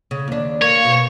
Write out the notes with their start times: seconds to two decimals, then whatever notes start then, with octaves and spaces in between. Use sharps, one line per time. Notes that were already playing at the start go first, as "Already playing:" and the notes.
0.11 C#3
0.28 D#2 D4
0.62 A#3 C#5
0.85 B2